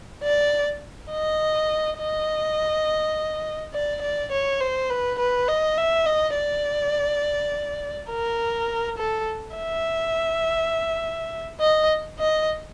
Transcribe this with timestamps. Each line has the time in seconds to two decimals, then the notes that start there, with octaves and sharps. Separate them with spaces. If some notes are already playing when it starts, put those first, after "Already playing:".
0.23 D5
1.11 D#5
1.98 D#5
3.73 D5
4.02 D5
4.32 C#5
4.61 C5
4.90 B4
5.19 B4
5.48 D#5
5.78 E5
6.06 D#5
6.36 D5
8.10 A#4
8.98 A4
9.56 E5
11.60 D#5
12.19 D#5